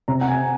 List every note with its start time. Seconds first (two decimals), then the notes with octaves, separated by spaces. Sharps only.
0.08 C3 A#5
0.21 F#5
0.28 G#5